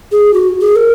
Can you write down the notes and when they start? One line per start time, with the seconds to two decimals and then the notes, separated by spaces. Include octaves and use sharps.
0.12 G#4
0.34 F#4
0.61 G#4
0.76 A#4